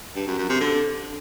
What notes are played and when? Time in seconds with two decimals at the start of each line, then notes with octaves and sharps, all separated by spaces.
0.16 G2
0.27 F#2
0.38 F#2
0.49 C3
0.60 D3